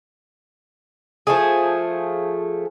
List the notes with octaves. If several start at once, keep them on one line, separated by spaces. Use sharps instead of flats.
F3 A3 G#4